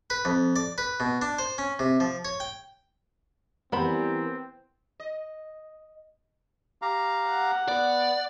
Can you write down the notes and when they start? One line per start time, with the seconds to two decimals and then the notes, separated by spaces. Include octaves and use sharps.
0.10 B4
0.25 F2
0.56 D5
0.78 B4
1.00 B2
1.22 D4
1.39 C5
1.58 C#4
1.79 C3
2.00 F3
2.25 C#5
2.40 G5
3.72 E3 G3 B3 C4 G4 A#4 C5 B5
5.00 D#5
6.82 G4 F5 A#5
7.29 F#5
7.68 B3 D5